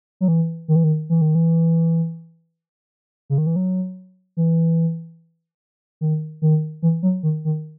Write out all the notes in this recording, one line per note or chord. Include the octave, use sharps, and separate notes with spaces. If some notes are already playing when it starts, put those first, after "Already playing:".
F#3
E3
D#3
E3
D#3
E3
D#3
E3
C#3
D#3
E3
F#3
E3
D#3
D#3
E3
F#3
D#3
D#3